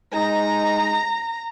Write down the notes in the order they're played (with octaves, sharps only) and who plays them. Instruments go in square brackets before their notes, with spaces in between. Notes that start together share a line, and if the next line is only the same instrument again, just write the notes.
[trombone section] G#3 D#4 [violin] A#5